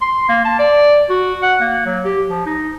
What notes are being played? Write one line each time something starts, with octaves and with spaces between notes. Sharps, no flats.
C6
A#3
A5
D5
F#4
F#5
A#3
F#3
G4
F3
D#4